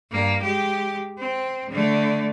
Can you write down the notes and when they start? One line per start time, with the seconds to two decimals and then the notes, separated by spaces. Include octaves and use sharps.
0.12 G2 A#3
0.41 G#3 G4
1.18 C4
1.70 D3 A3